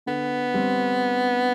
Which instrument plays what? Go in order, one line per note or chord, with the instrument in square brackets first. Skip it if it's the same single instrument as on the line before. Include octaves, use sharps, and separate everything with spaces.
[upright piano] D3 [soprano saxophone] B3
[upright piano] G3 C4